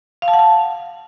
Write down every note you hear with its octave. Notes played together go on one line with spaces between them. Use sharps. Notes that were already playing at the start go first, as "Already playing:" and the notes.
F5
A5
F#5
A5